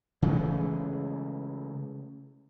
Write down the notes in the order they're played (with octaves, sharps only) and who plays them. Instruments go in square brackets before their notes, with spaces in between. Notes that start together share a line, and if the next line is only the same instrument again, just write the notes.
[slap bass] C#3 E3 G#3 A3